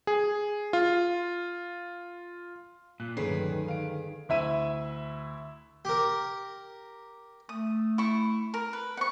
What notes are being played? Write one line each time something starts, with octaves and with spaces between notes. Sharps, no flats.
G#4
F4
A#2 F#6
D1 G1 D#3 C#4 G#4 B4 C7
F5 D7
D2 E4 E5 D#7
G4 A#4
A3 D#6
E4 C#6
A#4
B4
C5 F#5 C#6